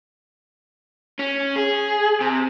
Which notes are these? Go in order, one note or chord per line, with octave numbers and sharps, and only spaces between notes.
C#4
G#4
C3